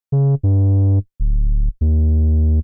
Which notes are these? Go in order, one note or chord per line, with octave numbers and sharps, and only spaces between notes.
C#3
G2
D1
D#2